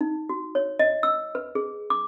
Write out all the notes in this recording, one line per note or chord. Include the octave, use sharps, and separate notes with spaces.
D#4
F#4
C#5
D#5
E6
B4
G#4
D6